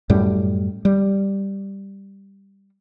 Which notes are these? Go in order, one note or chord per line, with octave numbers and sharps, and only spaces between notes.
F#2 A2 G3
G3